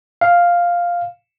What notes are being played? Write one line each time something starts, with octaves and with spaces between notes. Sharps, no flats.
F5